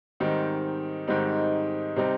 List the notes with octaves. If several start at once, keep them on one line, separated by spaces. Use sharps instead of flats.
G#2 D#3 G3 C4 D#4
G#2 D#3 G3 C4 D#4
C3 G3 C4 D#4